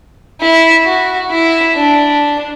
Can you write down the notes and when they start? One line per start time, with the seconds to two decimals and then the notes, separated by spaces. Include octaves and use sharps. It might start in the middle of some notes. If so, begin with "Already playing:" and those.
0.41 E4
0.85 F#4
1.31 E4
1.75 D4